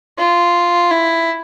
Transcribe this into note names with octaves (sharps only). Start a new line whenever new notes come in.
F4
E4